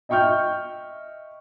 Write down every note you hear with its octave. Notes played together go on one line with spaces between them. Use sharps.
D#5 E5 G5 C#6 F6 G6